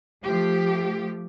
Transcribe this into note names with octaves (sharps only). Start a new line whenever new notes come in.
F3 A3 G4